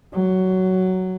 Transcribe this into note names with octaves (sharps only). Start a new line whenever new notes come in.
F#3